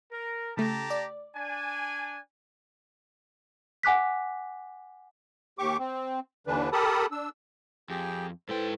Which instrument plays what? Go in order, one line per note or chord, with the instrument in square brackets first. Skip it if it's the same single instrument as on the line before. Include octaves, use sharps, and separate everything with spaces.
[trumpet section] A#4
[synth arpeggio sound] C#3 A3 [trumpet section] G4 A5 A#5
[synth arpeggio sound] D5
[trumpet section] D4 G#5
[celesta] F#5 G#5 D6 F#6 B6
[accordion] D#2 G4 C#6 D6
C4
D#2 D3 E3 D4 B4
G4 A4 A#4 A5 B5 D#6
D4 E6
[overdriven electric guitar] F2 [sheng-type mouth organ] G4 G#4 G5
[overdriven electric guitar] G#2 G5 [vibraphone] E4 A4 B4 [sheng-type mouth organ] C5